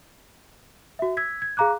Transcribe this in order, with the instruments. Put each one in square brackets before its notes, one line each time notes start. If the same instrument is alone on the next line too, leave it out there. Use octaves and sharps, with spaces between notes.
[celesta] F#4 E5
E6 G#6 B6
G#6
G#4 F5 A#5 D6 F#6